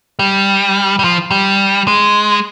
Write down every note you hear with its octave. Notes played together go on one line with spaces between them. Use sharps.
G3
G3
F3
G3
G#3